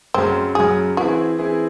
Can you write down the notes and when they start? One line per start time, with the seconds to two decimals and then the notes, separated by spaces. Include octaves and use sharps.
0.14 F#2 C#3 F#3 C4
0.55 F#2 C#3 F#3 G#4
0.97 E3 C4 E4 F#4 G#4
1.39 E3 C4 E4 G#4